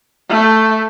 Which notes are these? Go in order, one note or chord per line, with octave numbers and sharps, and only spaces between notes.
A3